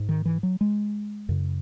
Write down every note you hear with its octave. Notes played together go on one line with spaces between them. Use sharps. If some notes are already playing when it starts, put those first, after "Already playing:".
Already playing: G#2
D#3
E3
F#3
G#3
F#2 C#3